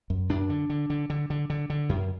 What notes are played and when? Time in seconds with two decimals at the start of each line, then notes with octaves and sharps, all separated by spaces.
0.10 F#2
0.29 F#2 D4
0.50 D3
0.70 D3
0.90 D3
1.10 D3
1.30 D3
1.50 D3
1.70 D3
1.89 F#2